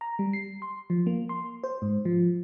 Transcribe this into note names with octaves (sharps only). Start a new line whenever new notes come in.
A#5
G3
C7
C6
F3
A#3
C6
C5
G#2
F3